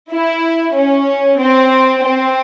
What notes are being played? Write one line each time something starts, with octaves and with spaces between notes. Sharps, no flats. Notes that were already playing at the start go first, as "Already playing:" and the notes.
E4
C#4
C4
C4